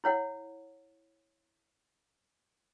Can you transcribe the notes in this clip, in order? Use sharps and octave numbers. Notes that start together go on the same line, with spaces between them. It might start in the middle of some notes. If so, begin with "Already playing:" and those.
E4 C#5 F#5